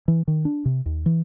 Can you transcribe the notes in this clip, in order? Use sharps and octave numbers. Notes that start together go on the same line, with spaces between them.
E3
D#3
D4
C3
D#2
E3